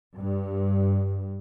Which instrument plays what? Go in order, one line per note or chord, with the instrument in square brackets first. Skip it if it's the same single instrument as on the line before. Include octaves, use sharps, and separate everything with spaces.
[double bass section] G2